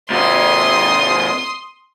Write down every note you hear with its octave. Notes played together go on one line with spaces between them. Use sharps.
G#2 C3 C6 D#6